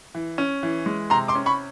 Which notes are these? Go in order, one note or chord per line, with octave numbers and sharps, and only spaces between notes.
E3
C#4
E3
G#3
C3 A#5 C6
C6 D6
C#4
B5 C#6